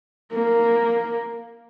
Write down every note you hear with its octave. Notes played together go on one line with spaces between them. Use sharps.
A#3